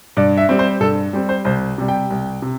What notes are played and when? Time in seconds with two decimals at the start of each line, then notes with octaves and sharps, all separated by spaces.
0.17 G2 D5
0.37 E5
0.49 G3 C4
0.59 C5
0.80 G2 A4
1.13 G3 C4
1.29 C5
1.45 C2 C5
1.78 C3 G3
1.88 G5
2.10 C2
2.42 C3